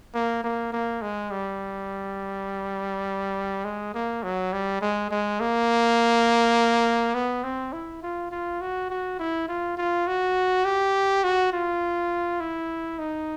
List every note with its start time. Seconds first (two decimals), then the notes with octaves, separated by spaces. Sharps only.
0.14 A#3
0.44 A#3
0.72 A#3
1.02 G#3
1.31 G3
3.65 G#3
3.94 A#3
4.23 F#3
4.53 G3
4.81 G#3
5.11 G#3
5.40 A#3
7.14 B3
7.44 C4
7.73 E4
8.03 F4
8.31 F4
8.61 F#4
8.90 F#4
9.19 E4
9.48 F4
9.78 F4
10.07 F#4
10.65 G4
11.24 F#4
11.52 F4
12.40 E4
12.98 D#4